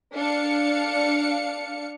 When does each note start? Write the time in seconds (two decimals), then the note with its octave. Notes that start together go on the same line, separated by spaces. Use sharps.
0.15 D4 F5 C#7